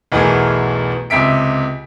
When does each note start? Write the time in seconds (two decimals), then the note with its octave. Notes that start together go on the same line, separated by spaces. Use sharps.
0.12 B1 E2 E3 A3 G#4 A#4
1.10 C#2 C3 E5 B6 D7